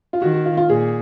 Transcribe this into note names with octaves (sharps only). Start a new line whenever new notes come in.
F4
D#3 F#4
F#4
F4
F4
A#2 G#4